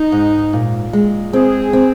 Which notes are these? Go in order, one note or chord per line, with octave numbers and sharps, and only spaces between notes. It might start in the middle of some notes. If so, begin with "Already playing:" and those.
Already playing: D#4
G#2
A#2
G#3
C4 G#4
C4